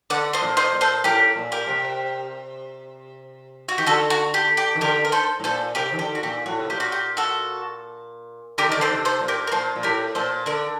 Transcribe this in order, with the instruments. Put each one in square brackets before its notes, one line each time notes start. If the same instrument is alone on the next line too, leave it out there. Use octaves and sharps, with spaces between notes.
[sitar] D3 [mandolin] D5 F#5
[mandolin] C5 D#5
[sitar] A#2
[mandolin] C5 D#5
[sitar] A#2
[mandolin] A4 C5
[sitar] A2 [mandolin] G4 A#4
[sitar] A#2
[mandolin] G4 A#4
[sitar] C3
[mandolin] F#4
[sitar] D#3 [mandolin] G4
[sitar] D3 [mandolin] F#4 A4
[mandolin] F#4
G4
G4
[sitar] D#3
[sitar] D3 [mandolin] G4 A#4
[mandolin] A#4
A4 C5
[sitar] A2
[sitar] A#2 [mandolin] A4 C5
[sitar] C3 [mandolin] G4 A#4
[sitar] D#3
[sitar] D3 [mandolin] G4
[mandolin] F#4
[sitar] A#2 [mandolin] G4
[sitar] A2 [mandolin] F#4
[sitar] C3
[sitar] A#2 [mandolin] G4
[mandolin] F#4
G4
F#4 A4
[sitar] D3 [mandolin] G4 A#4
[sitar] D#3 [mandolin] D5
[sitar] D3 [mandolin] A4 C5
[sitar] C3
[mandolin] A4 C5
[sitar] A#2
[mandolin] G4 A#4
A#4
[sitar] A#2 [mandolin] A4 C5
[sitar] A#2
[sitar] A2 [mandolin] G4 A#4
[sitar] A#2 [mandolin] A4 C5
[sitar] D3 [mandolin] A#4 D5